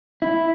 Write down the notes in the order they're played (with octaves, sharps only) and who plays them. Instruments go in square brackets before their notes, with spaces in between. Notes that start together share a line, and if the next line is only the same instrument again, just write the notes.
[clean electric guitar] E4